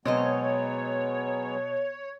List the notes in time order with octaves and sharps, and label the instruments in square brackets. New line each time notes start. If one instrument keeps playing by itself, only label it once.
[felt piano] B2 [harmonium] F#3 G#3 B3 [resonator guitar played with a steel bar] C4 C5 D#5 [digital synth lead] C#5